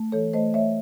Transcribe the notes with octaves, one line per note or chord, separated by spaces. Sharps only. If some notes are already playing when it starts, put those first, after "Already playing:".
Already playing: A3
E3 A4 C#5
A3 C5 D#5
A3 C#5 E5